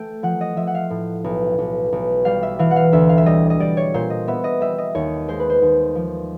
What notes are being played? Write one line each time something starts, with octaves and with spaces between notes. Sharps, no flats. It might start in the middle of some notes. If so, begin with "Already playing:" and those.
Already playing: A3 G5
F3 F#5
D#5
F3 E5
F#5
F5
A2
B1
B1
B1
G3 F5
E5
E3 F5
F#5
F5
D2 E5
F5
E5
G3 D#5
D#5
G3 D5
C#5
A#2 C5
D#5
B3 E5
D#5
G3 E5
D#5
D#2 C#5
G#3 C5
B4
C5
D#2
F3